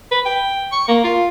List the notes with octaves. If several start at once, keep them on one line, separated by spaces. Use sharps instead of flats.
B4
G5
C#6
A#3
F4